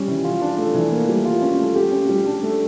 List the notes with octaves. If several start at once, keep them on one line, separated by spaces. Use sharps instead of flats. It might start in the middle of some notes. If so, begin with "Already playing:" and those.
Already playing: G3 C#4
E3
F4
D4
A3
E3
A#3
G3
F4
C#4
A3
G4
C#4
G3
D4
A3